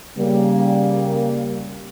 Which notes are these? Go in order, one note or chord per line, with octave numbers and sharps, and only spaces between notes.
C#3 G3 A#3